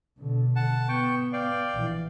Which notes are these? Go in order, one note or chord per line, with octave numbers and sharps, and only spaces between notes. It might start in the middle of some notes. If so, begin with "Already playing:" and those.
B2 D3
F#5 A5
B3 G5 C#6
D5 F5 G5
A#1 E3